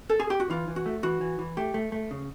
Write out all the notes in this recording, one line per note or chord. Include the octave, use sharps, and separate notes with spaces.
A4
G#4
G4
F#4
E3 F4
E3
F#4
A3
E3 F#4
E3
E3
A3 G4
A3
A3
C#3